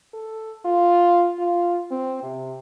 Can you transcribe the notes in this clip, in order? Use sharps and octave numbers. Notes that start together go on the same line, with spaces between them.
A4
F4
F4
C4
C3